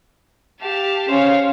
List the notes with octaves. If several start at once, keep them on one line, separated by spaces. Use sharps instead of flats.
G4 F5 A5
C#4 C5 C#5 F5